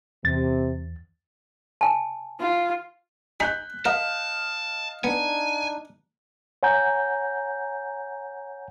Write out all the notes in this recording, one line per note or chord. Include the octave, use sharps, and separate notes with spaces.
E2 C3 A6
G#5 A5
F4
D#4 G#4 G#5 F#6 G6 B6
A#4 D#5 F5 A5 F6
B3 D4 D#4 G#5
C#5 F#5 G#5 A#5 G6